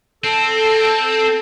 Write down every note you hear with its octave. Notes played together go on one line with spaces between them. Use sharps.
C4 A4